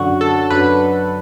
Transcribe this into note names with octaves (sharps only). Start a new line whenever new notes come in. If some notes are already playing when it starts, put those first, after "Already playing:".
Already playing: F#2 D3 F#3 F#4
A4
F#2 D3 F#3 B4